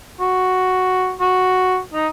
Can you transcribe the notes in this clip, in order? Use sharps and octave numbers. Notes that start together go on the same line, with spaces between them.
F#4
F#4
D#4